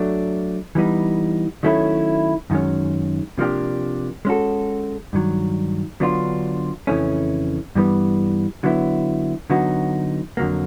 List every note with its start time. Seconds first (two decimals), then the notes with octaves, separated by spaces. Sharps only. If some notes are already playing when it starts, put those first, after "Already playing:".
Already playing: F#3 A3 D4
0.75 E3 G3 B3 D#4
1.63 D#3 F#3 A3 C#4 E4
2.50 F#2 D#3 G#3 C#4
3.38 C3 F3 A#3 D4 G4
4.25 G#3 C#4 F#4 A4
5.13 G2 D#3 F#3
6.00 D3 F#3 B3 D4 F4
6.87 F2 C#3 E3 A3 C#4
7.75 G2 E3 G3 B3
8.63 D3 F#3 B3 E4
9.50 D3 F#3 B3 D#4 F#4
10.37 F2 D3 F#3 A#3